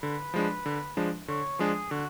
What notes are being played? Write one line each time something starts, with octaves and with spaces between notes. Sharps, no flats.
D3 B4
F3 G#3 D4
D3
F3 G#3 D4
D3 C#5
F3 G#3 D4 G#4
D3 F#4